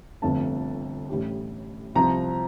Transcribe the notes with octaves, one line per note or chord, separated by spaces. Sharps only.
G1 F2 C3 F3 A3 A5
A1 A2 G3
C2 C3 F3 C4 A#5